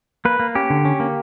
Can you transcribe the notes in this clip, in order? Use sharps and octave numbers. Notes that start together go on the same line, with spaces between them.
A#3 B4
A#3
C#4 G4
D3
C#4
A#3